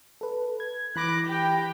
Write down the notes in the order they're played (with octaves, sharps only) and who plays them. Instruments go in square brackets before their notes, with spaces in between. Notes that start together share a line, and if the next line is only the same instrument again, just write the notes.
[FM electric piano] A4 B4
G#6
[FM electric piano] E3 B5 A#6 [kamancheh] D6 F#6
[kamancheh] G4 G5